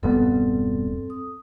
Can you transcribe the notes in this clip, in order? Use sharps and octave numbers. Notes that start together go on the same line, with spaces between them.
E1 G2 B3 C4 A4
D#6